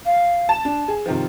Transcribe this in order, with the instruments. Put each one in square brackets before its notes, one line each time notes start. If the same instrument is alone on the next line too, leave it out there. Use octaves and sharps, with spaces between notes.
[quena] F5
[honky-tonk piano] A5 E7
[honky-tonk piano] D4 [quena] A5
[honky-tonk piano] G#4
[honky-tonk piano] C3 D#3 F3 [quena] F4